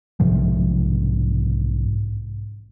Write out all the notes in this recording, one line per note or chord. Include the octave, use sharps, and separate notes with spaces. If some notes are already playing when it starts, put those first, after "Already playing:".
B1 G#2 C3 F3